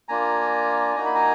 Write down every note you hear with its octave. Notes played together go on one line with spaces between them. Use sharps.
A#3 D4 F4 G#5 A#5
A#3 D#4 F#4 A#5
B5
G#5 A#5